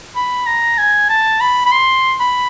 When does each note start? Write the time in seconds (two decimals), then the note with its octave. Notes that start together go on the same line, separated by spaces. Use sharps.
0.16 B5
0.46 A#5
0.78 G#5
1.09 A5
1.41 B5
1.66 B5
1.72 C6
2.20 B5